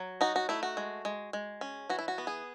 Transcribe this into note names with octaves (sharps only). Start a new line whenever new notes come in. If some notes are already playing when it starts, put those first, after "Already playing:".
Already playing: F#3
D#4 F#4
F#4
A3 E4
F#4
G#3
G#3
G#3
C#4
E3 F#4
E4
F#4
B3
G#4